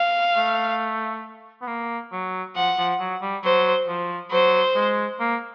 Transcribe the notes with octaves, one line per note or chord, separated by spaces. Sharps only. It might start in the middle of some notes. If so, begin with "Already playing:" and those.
Already playing: F5
A3
B3
A#3
F#3
F3 F#5
F3
F#3
G3
F#3 C5
F3
F#3 C5
G#3
A#3